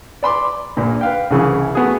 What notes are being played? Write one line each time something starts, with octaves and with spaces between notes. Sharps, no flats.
D5 B5 C6 D6
A#1 A#2
B4 F5 G5
C2 C#3 E3 G#4
A3 B3 F#4 G#4